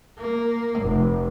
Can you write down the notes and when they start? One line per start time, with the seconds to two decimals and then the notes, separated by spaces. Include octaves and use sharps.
0.19 A#3
0.80 F1